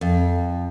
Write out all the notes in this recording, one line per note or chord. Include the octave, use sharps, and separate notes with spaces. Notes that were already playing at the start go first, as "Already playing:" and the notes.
F2